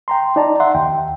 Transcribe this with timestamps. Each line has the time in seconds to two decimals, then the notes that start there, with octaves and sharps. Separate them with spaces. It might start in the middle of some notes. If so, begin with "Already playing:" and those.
0.08 G5 A#5 C6
0.36 D#4 D5 A5 A#5
0.60 E5 F#5 C6
0.75 D#2 G5